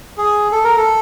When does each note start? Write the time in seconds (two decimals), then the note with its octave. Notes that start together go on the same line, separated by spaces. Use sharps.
0.18 G#4
0.52 A4
0.64 A#4
0.77 A4